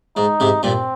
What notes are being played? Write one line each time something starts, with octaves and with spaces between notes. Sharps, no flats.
G#2 D#4
G#2 C3
G2 A#2 C4